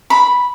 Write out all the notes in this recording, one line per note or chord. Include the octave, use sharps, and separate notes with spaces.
B5